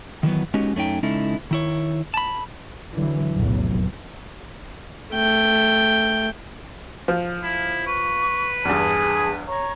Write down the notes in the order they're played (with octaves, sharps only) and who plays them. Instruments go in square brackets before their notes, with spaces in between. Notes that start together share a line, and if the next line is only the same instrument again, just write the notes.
[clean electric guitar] D#3 E3 F#3 B3
G#3 B3 C#4 D#4 F#4 G4
F#2 A3 C#4 D#4 G5
C#3 G#3 C#4 D#4 E4 A4
D#3 E4 C#5
A5 B5
[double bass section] D3 E3 F#3
F1 B1 E2 A2 F#3
[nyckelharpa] A3 G5
[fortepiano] F3
[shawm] E4
[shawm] B4 [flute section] C#6
[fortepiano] E2 G2 [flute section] G#4 A5
[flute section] C#5 A#5 C#6